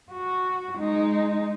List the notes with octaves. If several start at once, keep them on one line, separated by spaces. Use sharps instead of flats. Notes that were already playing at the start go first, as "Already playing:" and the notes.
F#4
G#3 D#4